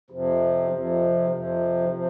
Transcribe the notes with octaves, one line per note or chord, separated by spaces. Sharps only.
F2 C3 F3
F2 C3 F3
F2 C3 F3
C3 F3